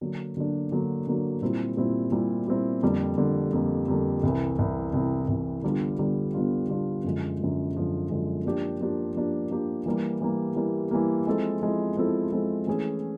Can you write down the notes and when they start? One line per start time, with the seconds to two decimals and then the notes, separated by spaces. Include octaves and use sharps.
0.01 D3 F#3 A#3 D4
0.37 D3 F#3 A#3 D4
0.72 D3 F#3 A#3 D4
1.07 D3 F#3 A#3 D4
1.42 A#2 G3 C4 E4
1.77 A#2 G3 C4 E4
2.12 A#2 G3 C4 E4
2.47 A#2 G3 C4 E4
2.83 F2 D3 G3 A#3
3.18 F2 D3 G3 A#3
3.53 F2 D3 G3 A#3
3.88 F2 D3 G3 A#3
4.23 C2 C3 E3
4.59 C2 C3 E3
4.93 C2 C3 E3
5.28 C2 C3 E3
5.63 D3 G3 B3 D4 F4
5.99 D3 G3 B3 D4 F4
6.34 D3 G3 B3 D4 F4
6.69 D3 G3 B3 D4 F4
7.04 F#2 D3 F3 G#3
7.39 F#2 D3 F3 G#3
7.75 F#2 D3 F3 G#3
8.10 F#2 D3 F3 G#3
8.45 F3 A#3 D4 G4
8.81 F3 A#3 D4 G4
9.15 F3 A#3 D4 G4
9.51 F3 A#3 D4 G4
9.86 E3 G3 A#3
10.21 E3 G3 A#3
10.56 E3 G3 A#3
10.91 E3 G3 A#3
11.27 F3 G#3 C4 E4 A4
11.61 F3 G#3 C4 E4 A4
11.97 F3 G#3 C4 E4 A4
12.32 F3 G#3 C4 E4 A4
12.67 E3 A3 C#4 E4 G#4